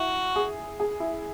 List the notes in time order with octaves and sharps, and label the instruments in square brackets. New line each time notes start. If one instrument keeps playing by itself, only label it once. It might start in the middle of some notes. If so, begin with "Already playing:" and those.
Already playing: [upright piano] E4 [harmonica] F#4
[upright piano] G#4
G#4
E4